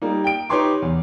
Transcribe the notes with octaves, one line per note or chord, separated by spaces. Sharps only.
G3 A#3 D#4
G5 D7
D#4 G4 B4 C#5 C6 D6
E2